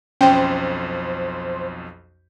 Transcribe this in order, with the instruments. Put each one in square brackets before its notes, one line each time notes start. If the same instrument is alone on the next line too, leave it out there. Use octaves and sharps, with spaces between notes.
[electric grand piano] B1 F2 [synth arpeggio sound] C#4 [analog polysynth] C5 [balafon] G5